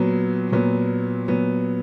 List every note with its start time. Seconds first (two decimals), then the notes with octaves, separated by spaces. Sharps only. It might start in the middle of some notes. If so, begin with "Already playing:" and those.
Already playing: A#2 F#3 B3
0.52 A#2 F#3 B3
1.28 A#2 F#3 B3